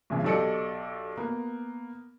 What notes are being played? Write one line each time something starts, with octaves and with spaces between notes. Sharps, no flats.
C2 A#2 C#3 E3
B1 G4 A4 D5 D#5 C#7
A#3 B3